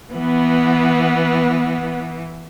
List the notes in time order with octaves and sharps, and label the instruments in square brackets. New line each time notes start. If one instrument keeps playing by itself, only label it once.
[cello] E3 [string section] B3